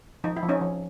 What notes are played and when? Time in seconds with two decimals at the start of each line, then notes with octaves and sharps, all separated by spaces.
0.24 F3 D#4
0.36 E4
0.43 F3
0.49 C#4 D#4
0.61 F3